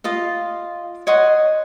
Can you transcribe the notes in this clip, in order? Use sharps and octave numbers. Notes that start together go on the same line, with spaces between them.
F4 D#5 F5
C#5 D#5 F#5 C6